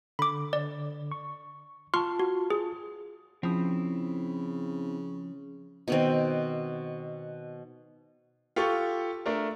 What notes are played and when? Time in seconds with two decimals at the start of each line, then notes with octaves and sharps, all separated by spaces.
0.19 D3 B5 D6
0.53 D5
1.12 C#6
1.94 F4 A5 C6 C#6 F6
2.20 F#4
2.50 G#4
3.43 C#3 F3 C4 E4 D#6
5.88 B2 D#3 C4
8.56 F4 G4 A4 C#6
9.26 A3 D4 A#4